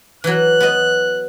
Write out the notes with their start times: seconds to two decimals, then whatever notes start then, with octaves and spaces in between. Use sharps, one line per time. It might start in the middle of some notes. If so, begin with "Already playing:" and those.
0.24 E3 F#3 F#6
0.60 B3 D#5